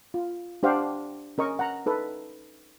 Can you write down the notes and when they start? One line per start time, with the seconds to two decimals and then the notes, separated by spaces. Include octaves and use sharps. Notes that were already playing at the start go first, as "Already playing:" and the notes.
0.14 F4
0.63 D4 G4 C5 F5 F#5
1.38 C#4 A#4 D#5 C#6
1.59 F#5 A#5
1.86 D#4 A4 B4